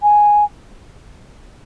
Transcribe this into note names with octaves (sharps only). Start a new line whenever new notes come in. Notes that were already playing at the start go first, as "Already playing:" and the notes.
G#5